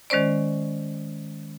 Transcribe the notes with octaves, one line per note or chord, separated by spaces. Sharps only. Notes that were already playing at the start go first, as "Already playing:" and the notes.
D#3 G#3 C#4 C5 D5